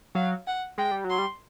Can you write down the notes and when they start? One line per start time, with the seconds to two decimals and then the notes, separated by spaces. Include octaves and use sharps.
0.15 F#3 F5
0.47 F#5
0.78 G#3 G5
0.91 G3
1.04 F#3
1.10 C6
1.19 G3